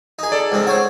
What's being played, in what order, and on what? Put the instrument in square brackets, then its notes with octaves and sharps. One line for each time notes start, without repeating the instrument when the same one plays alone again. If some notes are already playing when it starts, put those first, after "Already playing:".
[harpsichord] D#4 G#4
[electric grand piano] A4 D5
[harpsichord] C#2 C4 D#4
C5 C#5 F#5